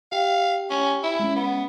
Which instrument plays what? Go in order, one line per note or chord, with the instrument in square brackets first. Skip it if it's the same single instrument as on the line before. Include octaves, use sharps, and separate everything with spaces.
[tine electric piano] G4 G5 [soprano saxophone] F5
[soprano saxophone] C#4
E4
[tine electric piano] G#3 C#4
[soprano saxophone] B3